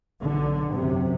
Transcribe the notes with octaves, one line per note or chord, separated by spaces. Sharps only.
B1 D3
F#2 C3